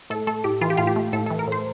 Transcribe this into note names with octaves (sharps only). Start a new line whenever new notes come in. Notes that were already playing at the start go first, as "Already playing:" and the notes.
A2 A4
A3 A4
A2 G4
E3 F4
G4
A2 F4
G4
A3
A2 A4
A4
E3
A#4
A2 C5